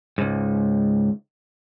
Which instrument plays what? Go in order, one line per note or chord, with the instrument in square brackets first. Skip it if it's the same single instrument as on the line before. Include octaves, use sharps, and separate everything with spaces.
[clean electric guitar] C#2 G#2